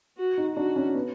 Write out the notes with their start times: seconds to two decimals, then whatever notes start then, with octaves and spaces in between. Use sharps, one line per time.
0.18 F#4
0.38 D#4
0.56 D4 F#4
0.76 C#4
0.95 B3